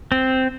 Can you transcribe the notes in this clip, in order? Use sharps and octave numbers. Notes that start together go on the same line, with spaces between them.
C4